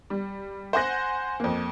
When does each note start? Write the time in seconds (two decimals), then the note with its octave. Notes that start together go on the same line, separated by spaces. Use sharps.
0.10 G3
0.73 C5 F#5 G#5 C6 F#6 A#6
1.40 F2 A#3